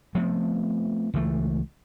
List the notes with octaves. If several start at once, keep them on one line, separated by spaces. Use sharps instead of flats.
F3 A3 B3 C4
C#2 E3 A3